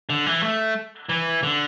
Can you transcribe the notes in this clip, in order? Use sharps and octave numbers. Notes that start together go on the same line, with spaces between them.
D3
E3
A3
E3
D3